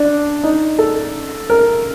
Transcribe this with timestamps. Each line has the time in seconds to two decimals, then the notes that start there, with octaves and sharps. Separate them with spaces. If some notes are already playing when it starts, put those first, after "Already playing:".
Already playing: D4
0.43 D#4
0.78 A4
1.50 A#4